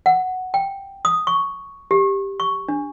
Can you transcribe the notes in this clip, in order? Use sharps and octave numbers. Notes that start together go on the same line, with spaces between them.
F#5
G5
D#6
C#6
G4
C#6
D4